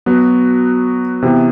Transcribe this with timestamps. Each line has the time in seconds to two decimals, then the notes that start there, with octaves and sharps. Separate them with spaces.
0.06 F#3 B3 F#4
1.22 C3 E3 B3